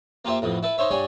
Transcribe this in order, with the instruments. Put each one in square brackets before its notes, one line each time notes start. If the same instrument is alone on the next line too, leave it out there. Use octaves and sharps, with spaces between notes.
[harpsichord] A#3 F4 G4 C5 E5
A1 F2 B2
E4 A4 B4
D#4 C5 C#5 E5
G2 G3 C#5 G#5